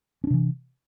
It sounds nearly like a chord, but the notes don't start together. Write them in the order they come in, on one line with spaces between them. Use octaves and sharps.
C#4 D4 C3 E3